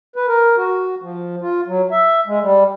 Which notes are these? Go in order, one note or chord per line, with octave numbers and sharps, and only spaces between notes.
B4
A#4
F#4
F3
F4
F#3
E5
G#3
G3